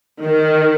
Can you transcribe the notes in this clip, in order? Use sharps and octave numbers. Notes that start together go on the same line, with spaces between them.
D#3